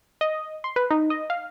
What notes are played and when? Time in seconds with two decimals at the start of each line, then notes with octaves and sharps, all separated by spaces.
0.21 D#5
0.64 C6
0.76 B4
0.91 D#4
1.10 D#5
1.30 F5